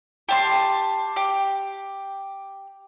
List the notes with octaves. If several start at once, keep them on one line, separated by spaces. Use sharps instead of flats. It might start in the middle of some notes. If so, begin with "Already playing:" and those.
G4 A5 C6
G4